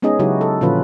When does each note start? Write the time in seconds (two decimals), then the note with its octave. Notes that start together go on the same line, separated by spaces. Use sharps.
0.02 G#3 B3 C#4 D#4 G#4 D#5
0.19 C#3 F#3 D#4 E4 F#4 G4
0.41 A4
0.61 A#2 D3 F3 C#4 F4 B4